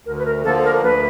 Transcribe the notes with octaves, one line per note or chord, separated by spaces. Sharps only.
D2 A#4
B4
A#4
D3 F3 A#3 A4
A#4
D2 B4